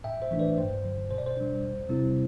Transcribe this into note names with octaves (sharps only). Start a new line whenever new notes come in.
A2 E5 G5
C5 E5
E3 A3 D4
B4 D5
G2 C5
D3 F#3
B2 C5
D5
C5
G3 D4
E2
C3 G3 C4 E4